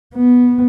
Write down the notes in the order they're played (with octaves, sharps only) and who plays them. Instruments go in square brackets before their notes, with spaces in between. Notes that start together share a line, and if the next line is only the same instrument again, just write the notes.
[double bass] B3